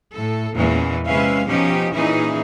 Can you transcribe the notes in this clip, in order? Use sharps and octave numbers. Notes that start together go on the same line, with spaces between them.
A2 A4
E2 A#2 E3 G#3 C#4
C3 G#3 C#4 B4 E5 F5
B2 F3 C#4 D#4 G4
A#2 E3 C#4 D#4 E4 G#4